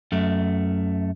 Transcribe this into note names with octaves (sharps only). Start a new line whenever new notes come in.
F#2 A3